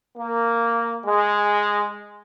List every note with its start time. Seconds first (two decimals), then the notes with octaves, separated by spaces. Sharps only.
0.17 A#3
1.06 G#3